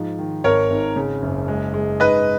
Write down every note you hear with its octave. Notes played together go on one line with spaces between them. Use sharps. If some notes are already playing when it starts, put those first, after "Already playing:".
Already playing: G#2 F3
D#3
G#1 A#4 C#5
G#1
C#3
F#1
G#3
G#3
G#2 B4 D#5